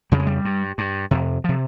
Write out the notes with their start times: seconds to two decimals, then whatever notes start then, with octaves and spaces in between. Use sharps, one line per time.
0.12 F2 C#3 G3
0.20 G#3
0.27 G3
0.45 G2
0.78 G2
1.11 F2 C3
1.44 C3 F3